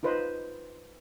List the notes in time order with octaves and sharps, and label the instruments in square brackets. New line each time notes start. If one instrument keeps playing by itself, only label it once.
[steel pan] D#4 F4 B4 C5 D#5